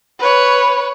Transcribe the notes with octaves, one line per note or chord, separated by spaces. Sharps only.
B4 C#5